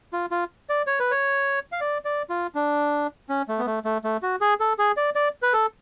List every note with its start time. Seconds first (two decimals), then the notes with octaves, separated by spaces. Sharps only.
0.13 F4
0.31 F4
0.69 D5
0.87 C#5
1.00 B4
1.11 C#5
1.72 F5
1.81 D5
2.05 D5
2.30 F4
2.55 D4
3.29 C#4
3.48 A3
3.58 B3
3.66 A3
3.85 A3
4.04 A3
4.23 F#4
4.41 G#4
4.60 A4
4.79 G#4
4.97 D5
5.15 D5
5.42 B4
5.53 A4